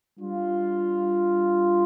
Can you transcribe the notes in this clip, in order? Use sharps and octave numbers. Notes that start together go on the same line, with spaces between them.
G3 D4 F4